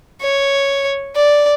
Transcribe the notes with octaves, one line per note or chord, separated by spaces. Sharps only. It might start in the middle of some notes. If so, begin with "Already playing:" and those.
C#5
D5